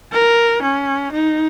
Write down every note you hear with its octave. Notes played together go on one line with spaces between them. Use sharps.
A#4
C#4
D#4